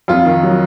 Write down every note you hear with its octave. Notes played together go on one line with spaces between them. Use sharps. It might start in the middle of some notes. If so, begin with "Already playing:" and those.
F2 F4
D#3
F#3